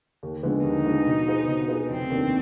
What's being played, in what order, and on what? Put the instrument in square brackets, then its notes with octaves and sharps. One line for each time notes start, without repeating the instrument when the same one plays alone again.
[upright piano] D#2
D3 F3 G#3 B3
[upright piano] D#2 [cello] D#4
[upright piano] D3 F3 G#3 B3
B2
B3 F4 G#4 C5
B2
B3 F4 G#4 C5
[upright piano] F1 [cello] C4
[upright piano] D#2 D#3 B3 D4